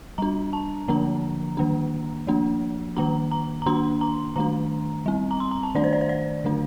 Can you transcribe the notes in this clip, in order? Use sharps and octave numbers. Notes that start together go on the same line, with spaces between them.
G3 D4 A#5
A5
D3 F3 A#3 D4 A#5
D#3 A#3 D4
F3 A#3 D4
D#3 A#3 D4 A#5
A#5
A#5
D#3 A#3 D4 C6
A#5
D#3 A3 D4 A#5
G3 C4
A#5
C6
A#5
A5
D#3 A3 D4 D5
C5
D5
C5
D5
D3 A3 D4